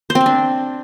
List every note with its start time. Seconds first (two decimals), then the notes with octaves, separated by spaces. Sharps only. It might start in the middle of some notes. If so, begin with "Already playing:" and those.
0.10 C5
0.15 C4
0.21 C5
0.26 D4